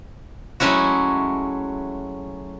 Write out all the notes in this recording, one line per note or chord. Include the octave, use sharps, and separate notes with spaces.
F#3 G#3 A3 C#4 E4 F#4